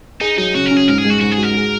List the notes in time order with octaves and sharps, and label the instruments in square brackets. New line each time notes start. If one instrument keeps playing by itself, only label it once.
[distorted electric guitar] D#4 [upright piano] G#4
[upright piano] F#3 [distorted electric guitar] D#4
[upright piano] C#3 [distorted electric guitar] F#4
[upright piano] C#4 [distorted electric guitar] A#4
[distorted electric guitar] G#4
[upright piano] G#2 [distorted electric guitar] A#4
[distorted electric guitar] G#4
[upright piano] G#3
[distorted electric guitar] F#4
[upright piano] G#2 [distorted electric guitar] F#4
[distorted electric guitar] G#4
[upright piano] F#4
[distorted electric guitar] A#4
[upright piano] G#4